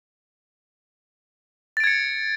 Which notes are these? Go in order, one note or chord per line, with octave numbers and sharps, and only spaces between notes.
G#6 A6 C#7 D7